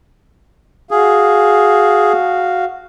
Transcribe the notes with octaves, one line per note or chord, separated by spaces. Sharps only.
F#4 G#4 F5